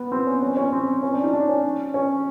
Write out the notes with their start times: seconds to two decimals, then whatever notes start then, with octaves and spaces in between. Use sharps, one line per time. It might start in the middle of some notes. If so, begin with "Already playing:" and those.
Already playing: B3
0.12 C4
0.26 C#4
0.42 C#4
0.57 C#4
0.72 C4
1.03 C#4
1.13 D4
1.23 D#4
1.33 D4
1.48 C#4
1.94 C#4